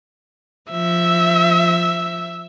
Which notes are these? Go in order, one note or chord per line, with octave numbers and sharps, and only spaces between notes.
F3 E5